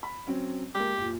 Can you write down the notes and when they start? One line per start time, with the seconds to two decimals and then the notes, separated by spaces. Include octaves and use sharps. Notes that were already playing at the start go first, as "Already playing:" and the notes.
0.03 B5
0.27 F#3 C4 C#4
0.75 G#3 A#3 G4
0.97 F#1 A#2